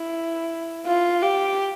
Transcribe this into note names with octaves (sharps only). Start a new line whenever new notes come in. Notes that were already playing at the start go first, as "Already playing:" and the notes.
Already playing: E4
F4
G4